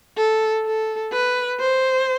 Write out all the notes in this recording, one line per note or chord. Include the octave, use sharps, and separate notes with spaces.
A4
A4
B4
C5